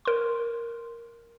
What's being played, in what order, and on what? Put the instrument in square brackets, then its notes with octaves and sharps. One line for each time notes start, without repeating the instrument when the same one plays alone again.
[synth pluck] A#4 C6